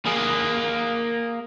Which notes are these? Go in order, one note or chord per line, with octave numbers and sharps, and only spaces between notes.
A#3 G#4